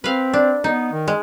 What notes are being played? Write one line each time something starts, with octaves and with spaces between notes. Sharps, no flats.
C4 B4 F5
D4
B3 D#4
D#3
G#3